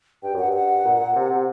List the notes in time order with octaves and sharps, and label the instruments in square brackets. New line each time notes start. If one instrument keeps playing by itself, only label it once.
[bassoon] G2 [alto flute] G5
[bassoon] F#2
[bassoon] G2 [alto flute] F#5
[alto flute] F#5
[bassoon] A#2
A#2
C3
C3